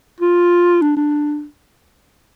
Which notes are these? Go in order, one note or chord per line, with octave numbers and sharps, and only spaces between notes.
F4
D4
D4